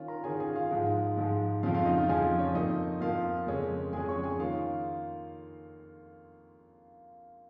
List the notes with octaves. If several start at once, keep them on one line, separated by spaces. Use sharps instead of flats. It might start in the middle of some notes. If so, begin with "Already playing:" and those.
Already playing: D#3 C#4 F4
A#4 A#5
D#3 C#4 F4 G#4 G#5
G#4 G#5
F4 F5
G#2 F3 G#3
G#2 F3 G#3
F2 C#3 F3 F4 F5
F4 F5
D#4 D#5
F4 F5
F2 C#3 F3 G#4 G#5
C#4 C#5
F2 F3 A#3 D#4 D#5
F2 F3 A#3 F4 F5
F2 C#3 G#3 C#4
F2 C#3 G#3 C#4 G#4 G#5
C#5 C#6
G#4 G#5
D#3 A#3 C#4 F4 F5